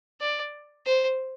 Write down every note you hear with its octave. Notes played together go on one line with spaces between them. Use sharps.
D5
C5